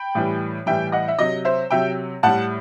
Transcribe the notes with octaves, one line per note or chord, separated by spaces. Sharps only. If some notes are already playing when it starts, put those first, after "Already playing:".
Already playing: G5 B5
A2 E3 G3
A2 E3 G3 E5 G5
D#5 F#5
E5
C3 F#3 D#5
C5 E5
C3 F#3 E5 G5
A2 G3 F#5 A5